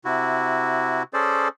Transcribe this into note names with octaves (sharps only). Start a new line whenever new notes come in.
C3 E4 F#4
C#4 G#4 A4 C5 D5